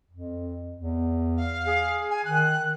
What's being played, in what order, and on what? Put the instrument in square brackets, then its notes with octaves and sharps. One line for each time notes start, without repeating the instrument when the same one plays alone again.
[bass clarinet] F2
E2
[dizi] F5
[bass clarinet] G#4
[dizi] G#5
[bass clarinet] D#3 [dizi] F#6